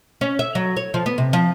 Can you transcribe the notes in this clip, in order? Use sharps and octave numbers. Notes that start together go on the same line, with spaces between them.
C#4
E5
F#3
C#5
F3
B3
C3
F3